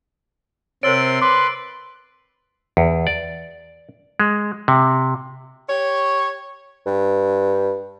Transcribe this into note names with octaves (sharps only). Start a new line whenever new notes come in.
C3 A#4 C5 C#5 C6 E6 A6 D7
B4 C6 D6
E2
D5
G#3
C3
G4 C#5
G2